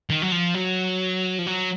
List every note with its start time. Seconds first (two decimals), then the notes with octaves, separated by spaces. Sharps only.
0.10 D#3
0.22 F#3
0.32 F3
0.54 F#3
1.39 F3
1.47 F#3